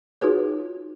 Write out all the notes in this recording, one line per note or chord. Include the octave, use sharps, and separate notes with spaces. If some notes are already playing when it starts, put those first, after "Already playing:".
D#4 F4 F#4 G#4 B4 C#5